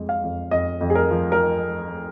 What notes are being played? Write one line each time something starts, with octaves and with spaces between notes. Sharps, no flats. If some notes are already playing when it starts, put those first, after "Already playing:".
Already playing: F2 G#3
F5
F2
F2 D#5
F2
G#4
A#4
F3
A#4